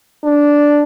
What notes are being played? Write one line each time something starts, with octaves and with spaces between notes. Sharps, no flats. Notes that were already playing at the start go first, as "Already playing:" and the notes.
D4